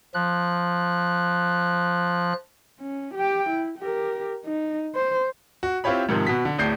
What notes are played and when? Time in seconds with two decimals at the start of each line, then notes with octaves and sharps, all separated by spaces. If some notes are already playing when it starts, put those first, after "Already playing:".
0.14 F3 F#6
2.81 C#4
3.15 G4 G5
3.49 E4
3.79 G4 A#4
4.45 D#4
4.95 C5
5.63 F#4
5.84 C4 E4 F4 G4 C#5 B5
6.09 G#2 C3 D#3 F3
6.27 B2 F#4 B6
6.45 D3
6.58 D1 A2 D5 G6 C7